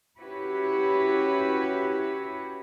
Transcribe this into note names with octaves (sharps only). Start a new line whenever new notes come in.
C#4 E4 F#4 G4 B4 C#5